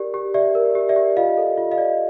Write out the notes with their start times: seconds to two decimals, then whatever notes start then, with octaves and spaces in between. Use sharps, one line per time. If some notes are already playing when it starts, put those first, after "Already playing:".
Already playing: G4 A#4 D5
0.14 G4
0.34 G4 D5 E5
0.55 A#4
0.75 G4
0.89 D5 E5
0.96 G4
1.17 F4 D#5 F5
1.37 A4
1.58 F4
1.71 D#5 F5
1.78 D5